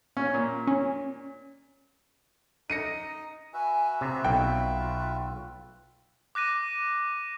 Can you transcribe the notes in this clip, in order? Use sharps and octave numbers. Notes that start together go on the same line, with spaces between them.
C#4
A#2
C#4
D#4 D#5 A#6 C#7 D#7
F#4 B4 E5 G#5
C3 C4
B1 F4 G5
D6 F#6 A#6 D#7